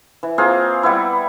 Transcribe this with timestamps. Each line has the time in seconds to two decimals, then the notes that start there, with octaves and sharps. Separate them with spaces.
0.23 E3
0.38 A#3 C4 F4 G#4
0.83 G3 B3 E4